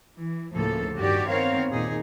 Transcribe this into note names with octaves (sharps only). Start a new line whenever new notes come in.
E3
D2 A2 C#3 F3 A#3 A4
G2 D#3 F#4 G4 D5
D#3 B3 C4 A#4 C#5 F5
D#2 A#2 D#4 G#4